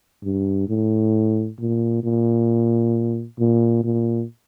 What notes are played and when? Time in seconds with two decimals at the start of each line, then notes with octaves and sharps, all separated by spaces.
0.24 G2
0.69 A2
1.60 A#2
2.04 A#2
3.40 A#2
3.84 A#2